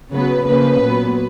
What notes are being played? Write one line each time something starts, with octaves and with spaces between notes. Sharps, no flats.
C#3 F#3 B3 B4
C#3 F3 A#3 C#4 B4
A#2 F#3 B3